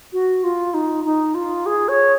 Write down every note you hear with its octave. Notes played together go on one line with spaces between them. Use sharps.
F#4
F4
D#4
D#4
F4
G#4
C#5